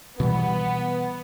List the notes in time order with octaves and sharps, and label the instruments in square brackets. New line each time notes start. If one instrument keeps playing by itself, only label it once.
[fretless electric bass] B2 E3 G3 [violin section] B3